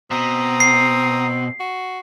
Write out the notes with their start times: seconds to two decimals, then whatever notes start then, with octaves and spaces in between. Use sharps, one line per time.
0.11 B2 C4 A#5 D#6
0.60 C7
1.60 F#4